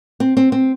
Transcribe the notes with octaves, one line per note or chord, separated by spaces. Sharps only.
C4
C4
C4